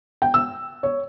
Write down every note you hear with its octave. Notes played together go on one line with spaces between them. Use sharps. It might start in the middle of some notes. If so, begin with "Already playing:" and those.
G5
E6
C#5